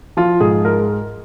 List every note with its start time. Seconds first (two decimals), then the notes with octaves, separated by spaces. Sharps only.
0.17 F3 F4
0.40 G#2 G#4
0.65 G#3 A#4